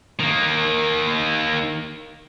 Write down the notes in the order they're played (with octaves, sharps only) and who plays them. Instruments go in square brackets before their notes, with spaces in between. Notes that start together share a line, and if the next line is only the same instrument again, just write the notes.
[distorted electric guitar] D#3 A#3